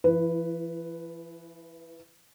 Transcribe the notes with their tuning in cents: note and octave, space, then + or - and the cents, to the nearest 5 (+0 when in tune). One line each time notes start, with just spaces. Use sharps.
E3 +40 E4 +0 B4 +0